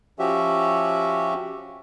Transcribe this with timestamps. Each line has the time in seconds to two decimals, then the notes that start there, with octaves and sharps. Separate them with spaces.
0.19 F3 C#4 F#4 G4 E5